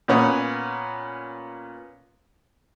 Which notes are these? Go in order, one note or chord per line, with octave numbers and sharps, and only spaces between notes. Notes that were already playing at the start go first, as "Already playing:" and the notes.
A#2 B3 C#4 D#6